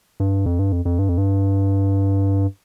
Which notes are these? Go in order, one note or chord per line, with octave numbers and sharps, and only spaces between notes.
G2
F2
G2
F2
F2
G2
F2
G2